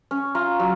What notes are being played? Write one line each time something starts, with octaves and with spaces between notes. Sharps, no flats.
C#4
F4 A#5
F#3